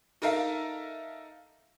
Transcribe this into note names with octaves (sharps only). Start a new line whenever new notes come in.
D#4 A4 A#4 E5 F5